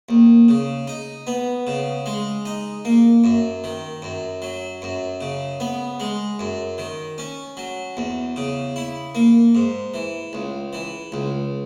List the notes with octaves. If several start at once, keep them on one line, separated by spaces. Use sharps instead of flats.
D#2
C#3
D#4
B3
C#3
G#3
D#4
A#3
F#2
D#3
F#2
F#3
F#2
C#3
B3
G#3
F#2
D#3
C#4
F#3
E2
C#3
E4
A#3
G#2
E3
C#2
E3
C#2